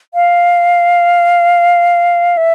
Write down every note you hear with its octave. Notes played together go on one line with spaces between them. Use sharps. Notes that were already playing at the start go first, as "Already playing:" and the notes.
F5
E5